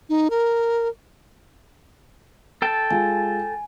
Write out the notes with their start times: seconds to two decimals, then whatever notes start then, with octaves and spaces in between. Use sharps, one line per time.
0.09 D#4
0.30 A#4
2.62 A4 G5 A5
2.91 G#3 F4 G#5